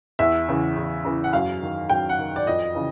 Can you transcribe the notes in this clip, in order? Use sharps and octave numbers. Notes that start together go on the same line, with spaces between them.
E2 E5
C#3 E3
E2
C#3 E3
F#5
F#2 F5
D#3
F#2 G5
F#5
D#3
D5
F2 D#5
C#3 E3